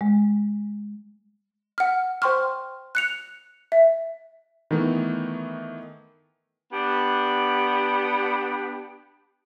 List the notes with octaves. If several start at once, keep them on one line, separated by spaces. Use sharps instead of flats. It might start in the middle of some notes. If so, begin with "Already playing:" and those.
G#3
F#5 F6
C5 G5 C6 C#6 F6
F#6 C#7 F7
E5
D#3 E3 A3 B3
B3 D4 G4